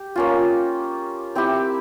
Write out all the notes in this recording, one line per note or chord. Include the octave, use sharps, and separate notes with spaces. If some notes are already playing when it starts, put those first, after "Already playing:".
Already playing: G4
A#3 C#4 F4
C4 E4 G4